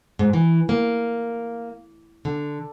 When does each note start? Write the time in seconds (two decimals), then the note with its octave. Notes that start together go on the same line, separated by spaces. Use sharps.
0.19 G#2
0.33 E3
0.69 A#3
2.25 D3